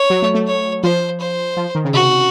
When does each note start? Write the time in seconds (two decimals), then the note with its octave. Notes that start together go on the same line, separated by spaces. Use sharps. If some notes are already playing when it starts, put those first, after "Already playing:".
Already playing: C#5
0.10 F#3
0.22 A3
0.34 A3
0.47 C#5
0.83 F3 C5
1.20 C5
1.57 F3
1.75 D#3
1.85 C#3
1.94 C3 F#4